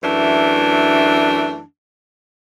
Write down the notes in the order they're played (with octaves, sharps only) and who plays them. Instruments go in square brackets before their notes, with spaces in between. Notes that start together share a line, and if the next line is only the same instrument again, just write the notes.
[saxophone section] F#2 E3 A3 D4